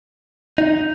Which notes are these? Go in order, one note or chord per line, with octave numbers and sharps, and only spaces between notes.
D#4